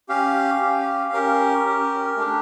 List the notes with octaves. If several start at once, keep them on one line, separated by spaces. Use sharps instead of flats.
C#4 G4 F5
C#4 G4
C#4 G4 A#4
C#4 G4
A3 D4 G4